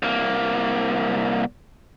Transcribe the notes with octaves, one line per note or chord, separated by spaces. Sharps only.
C2 A#3